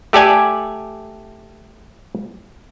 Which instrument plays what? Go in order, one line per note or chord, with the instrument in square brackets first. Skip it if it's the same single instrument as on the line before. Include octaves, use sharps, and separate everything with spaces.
[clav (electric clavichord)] A3 G4 A4 D5 G#5